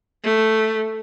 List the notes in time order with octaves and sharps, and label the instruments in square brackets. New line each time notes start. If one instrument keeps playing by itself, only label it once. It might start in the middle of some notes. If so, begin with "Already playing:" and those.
[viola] A3